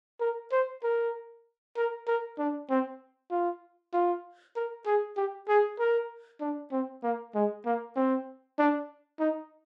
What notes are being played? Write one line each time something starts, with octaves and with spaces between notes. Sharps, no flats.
A#4
C5
A#4
A#4
A#4
D4
C4
F4
F4
A#4
G#4
G4
G#4
A#4
D4
C4
A#3
G#3
A#3
C4
D4
D#4